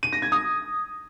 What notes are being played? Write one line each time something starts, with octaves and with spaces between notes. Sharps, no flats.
D#7
A#6
G#6
D#6